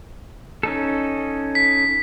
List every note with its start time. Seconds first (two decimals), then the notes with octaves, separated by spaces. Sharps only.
0.63 C#4 D#4 A4
1.55 B6